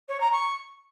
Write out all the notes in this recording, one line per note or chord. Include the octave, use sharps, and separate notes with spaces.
C#5
A#5
C#6